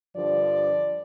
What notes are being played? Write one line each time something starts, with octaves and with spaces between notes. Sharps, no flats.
G2 D3 F3 D5